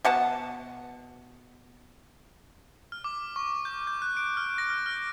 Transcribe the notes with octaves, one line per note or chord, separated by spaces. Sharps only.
B2 F#5 A5
F6
D6
C#6
G6
G6
F#6
D7
F6
A#6
F6
F6